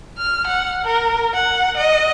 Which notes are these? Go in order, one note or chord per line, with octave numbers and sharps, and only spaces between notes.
F6
F#5
A#4
F#5
D#5